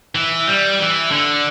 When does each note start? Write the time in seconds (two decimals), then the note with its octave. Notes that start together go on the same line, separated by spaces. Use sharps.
0.15 E3
0.48 G3
0.80 E3
1.11 D3